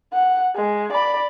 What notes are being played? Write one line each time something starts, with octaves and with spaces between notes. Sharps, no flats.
F#5
G#3
D5 B5